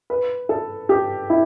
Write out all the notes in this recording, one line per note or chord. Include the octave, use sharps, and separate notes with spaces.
B4
A4
G4
E4